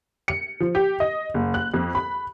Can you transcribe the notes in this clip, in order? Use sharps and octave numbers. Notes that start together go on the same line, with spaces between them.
C#7
F3
G4
D#5
F#1
F#6
F2
B5